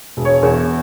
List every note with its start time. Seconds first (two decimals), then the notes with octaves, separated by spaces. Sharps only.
0.17 E1
0.25 C#5
0.43 E2